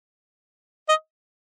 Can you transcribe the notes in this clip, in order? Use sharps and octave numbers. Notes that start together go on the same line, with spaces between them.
D#5